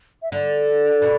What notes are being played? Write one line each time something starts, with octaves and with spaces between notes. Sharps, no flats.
E5
D3 D5
B2